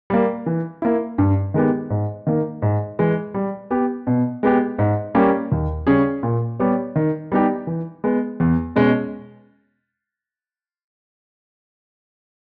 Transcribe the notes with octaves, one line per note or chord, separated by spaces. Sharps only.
G3 A#3
E3
A#3 E4
G2
D#3 G#3 B3 G4
G#2
D#3 A#3
G#2
E3 G#3
G3
B3 G4
B2
G#3 B3 G4
G#2
G3 A#3 C#4 G4
D#2
C#3 G3 C#4 G#4
A#2
G3 B3 G4 C#5
D#3
G3 B3 D#4 G4
E3
G#3 B3
E2
B2 G#3 C#4